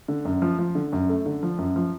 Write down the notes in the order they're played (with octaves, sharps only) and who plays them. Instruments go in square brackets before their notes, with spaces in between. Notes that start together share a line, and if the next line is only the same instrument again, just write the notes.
[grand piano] D3
F#2
F3
F3
D3
F#2
A3
D3
F3
F#2
F3